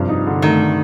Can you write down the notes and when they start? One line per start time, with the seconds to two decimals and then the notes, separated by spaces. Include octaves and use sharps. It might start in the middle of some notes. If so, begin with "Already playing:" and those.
Already playing: G2 C3 F3
0.09 D#4
0.27 D3
0.42 D#3 A3